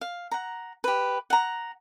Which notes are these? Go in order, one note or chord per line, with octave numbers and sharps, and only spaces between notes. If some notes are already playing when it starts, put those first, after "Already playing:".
F5
F#5 A#5
G4 B4
F#5 A#5